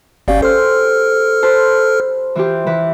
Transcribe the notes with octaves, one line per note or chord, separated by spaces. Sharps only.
G1 C#4 G4 D5 F5
A4 C5 F6
B4 C5 A5
E3 F4 G4
E3 B4